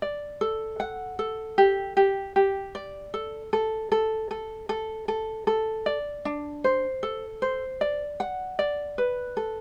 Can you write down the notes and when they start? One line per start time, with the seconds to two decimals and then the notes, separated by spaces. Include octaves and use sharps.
0.02 D5
0.41 A4
0.80 F#5
1.19 A4
1.58 G4
1.97 G4
2.36 G4
2.75 D5
3.14 A4
3.53 A4
3.92 A4
4.31 A4
4.69 A4
5.08 A4
5.47 A4
5.86 D5
6.25 D4
6.64 C5
7.03 A4
7.42 C5
7.81 D5
8.20 F#5
8.59 D5
8.98 B4
9.37 A4